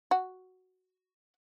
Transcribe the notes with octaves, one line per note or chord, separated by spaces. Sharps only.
F#4